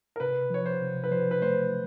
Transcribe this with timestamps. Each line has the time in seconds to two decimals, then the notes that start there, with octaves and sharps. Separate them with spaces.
0.16 A#4
0.20 C3 B4
0.50 F3 C#5
0.66 C5
0.81 C3
1.04 B4
1.11 F3 C5
1.31 B4
1.42 A3 C5